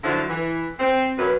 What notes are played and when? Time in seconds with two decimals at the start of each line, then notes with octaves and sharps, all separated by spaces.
0.04 D3 F3 F#3 E4
0.29 E3
0.79 C4
1.18 F#2 B4